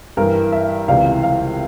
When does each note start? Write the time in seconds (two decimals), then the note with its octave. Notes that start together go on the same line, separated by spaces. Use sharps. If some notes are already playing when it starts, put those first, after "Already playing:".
0.17 G2 E3 A#4
0.52 E5
0.88 C#2 C3 E3 F5
1.23 F5